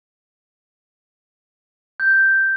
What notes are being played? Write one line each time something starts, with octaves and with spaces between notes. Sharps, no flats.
G6